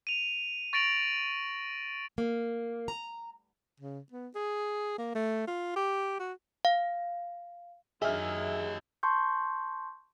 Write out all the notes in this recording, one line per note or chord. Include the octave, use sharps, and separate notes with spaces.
D#7 F7
C#6 A6 A#6 D7 F7 F#7
A#3
A#5
C#3
B3
G#4
A#3
A3
F4
G4
F#4
F5
F#2 D#3 F#3 G4 G#4 D#5 E5 F6
A5 C6 C#6 G6